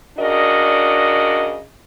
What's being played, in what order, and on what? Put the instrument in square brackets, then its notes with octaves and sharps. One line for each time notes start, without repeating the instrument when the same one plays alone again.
[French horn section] C#3 D4 F#4 A#4 D5 D#5